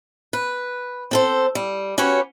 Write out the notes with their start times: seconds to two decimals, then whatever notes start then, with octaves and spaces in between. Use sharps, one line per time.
0.33 B4
1.11 C4 A4 C5
1.55 G3
1.98 C#4 F#4 G4 B4 C#5